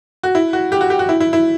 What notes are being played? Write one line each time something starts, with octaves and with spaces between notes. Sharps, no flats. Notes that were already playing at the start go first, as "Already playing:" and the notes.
F#4
E4
F#4
G4
F#4
G4
F#4
E4
E4
E4